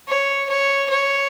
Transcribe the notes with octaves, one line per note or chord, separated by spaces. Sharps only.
C#5
C#5
C#5